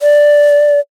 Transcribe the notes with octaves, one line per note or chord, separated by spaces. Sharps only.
D5